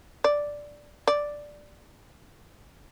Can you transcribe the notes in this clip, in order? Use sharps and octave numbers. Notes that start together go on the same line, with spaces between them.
D5
D5